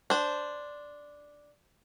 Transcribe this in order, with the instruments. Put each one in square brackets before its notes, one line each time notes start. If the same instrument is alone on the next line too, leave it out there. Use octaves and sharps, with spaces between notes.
[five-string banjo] D4 C5